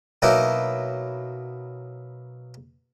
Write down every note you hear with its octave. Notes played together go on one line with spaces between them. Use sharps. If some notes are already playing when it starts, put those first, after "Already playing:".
B2 F#3 A#3 D#4 E4